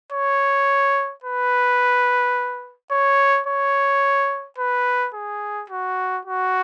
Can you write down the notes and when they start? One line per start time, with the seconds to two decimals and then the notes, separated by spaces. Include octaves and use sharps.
0.13 C#5
1.24 B4
2.91 C#5
3.47 C#5
4.58 B4
5.14 G#4
5.70 F#4
6.26 F#4